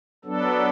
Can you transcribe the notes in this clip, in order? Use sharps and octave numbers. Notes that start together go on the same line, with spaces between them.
F#3 B3 D4 A4